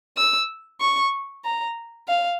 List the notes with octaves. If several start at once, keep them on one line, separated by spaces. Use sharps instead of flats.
E6
C#6
A#5
F5